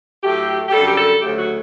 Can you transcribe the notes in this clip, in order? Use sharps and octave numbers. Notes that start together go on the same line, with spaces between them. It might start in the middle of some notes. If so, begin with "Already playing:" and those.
A2 F#3 A3 G4
G4
F#2 D3 G3 A4
G4
A4
D2 C#3 F#3 A3 G4
F#4